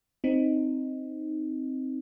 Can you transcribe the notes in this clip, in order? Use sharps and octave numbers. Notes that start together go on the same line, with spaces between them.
C4 D#4